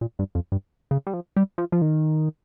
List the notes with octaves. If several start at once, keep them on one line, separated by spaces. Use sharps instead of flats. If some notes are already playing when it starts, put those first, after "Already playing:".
A#2
G2
F2
G2
C#3
G3
F3
G3
F3
F3
D#3